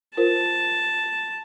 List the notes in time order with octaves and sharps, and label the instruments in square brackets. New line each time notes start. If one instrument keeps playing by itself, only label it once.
[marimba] F4 A#4 C5 [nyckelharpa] A5